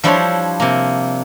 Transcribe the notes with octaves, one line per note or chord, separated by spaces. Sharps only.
F3 G3 D4 E4 C5 C#5
C3 A#3